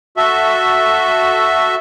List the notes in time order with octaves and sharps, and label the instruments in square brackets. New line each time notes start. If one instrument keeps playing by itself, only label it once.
[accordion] F#4 A4 E5